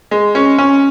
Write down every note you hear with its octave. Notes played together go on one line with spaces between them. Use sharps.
G#3
C#4
C#4